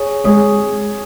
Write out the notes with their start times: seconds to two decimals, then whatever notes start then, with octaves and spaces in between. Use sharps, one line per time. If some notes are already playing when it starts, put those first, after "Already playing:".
Already playing: G#4 C#5
0.24 G#3 G#4 C#5